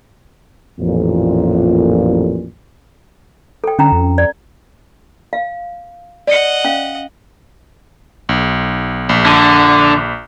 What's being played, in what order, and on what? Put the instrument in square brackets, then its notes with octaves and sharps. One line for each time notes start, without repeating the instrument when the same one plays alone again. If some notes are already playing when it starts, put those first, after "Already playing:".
[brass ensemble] A1 F2 A#2
[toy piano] A4 G5
[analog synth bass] D3 [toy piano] C#4 G5 A#5
[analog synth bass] F2
[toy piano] D5
F5
[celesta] D5 C#7 [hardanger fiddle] D#5 F#5
[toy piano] C#4 F5
[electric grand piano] B1
A#1
[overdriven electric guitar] D3